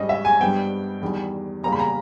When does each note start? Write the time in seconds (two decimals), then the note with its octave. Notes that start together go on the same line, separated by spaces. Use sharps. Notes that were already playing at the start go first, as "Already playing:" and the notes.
Already playing: G#1 G#2 G3 C#4 D#5
0.09 E5
0.25 G#5
0.41 G2 G3 B3 G5
1.01 E2 D#3 G3
1.63 E2 C#3 G3 A#3 C#4 A#5
1.72 B5
1.80 A#5